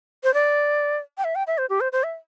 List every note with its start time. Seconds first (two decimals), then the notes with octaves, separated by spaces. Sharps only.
0.24 C5
0.34 D5
1.18 G5
1.24 E5
1.35 G5
1.47 E5
1.58 C5
1.70 G4
1.81 C5
1.92 C5
2.03 E5